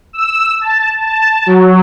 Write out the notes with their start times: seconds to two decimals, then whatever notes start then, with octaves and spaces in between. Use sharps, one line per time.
0.13 E6
0.61 A5
1.00 A5
1.46 F#3